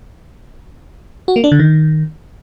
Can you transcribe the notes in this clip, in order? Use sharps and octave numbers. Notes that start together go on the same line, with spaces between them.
F#4
A#3
D4
D3
D#3